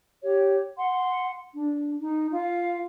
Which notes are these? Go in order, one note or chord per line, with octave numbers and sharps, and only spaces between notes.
G4 C#5
F#5 C6
D4
D#4
F4 F5